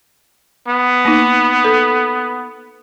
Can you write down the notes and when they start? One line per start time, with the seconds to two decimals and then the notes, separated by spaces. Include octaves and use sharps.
0.68 B3
1.05 A#3 D#4
1.64 A4